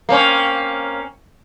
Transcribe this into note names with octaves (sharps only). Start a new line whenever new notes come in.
A#3 C4 C#4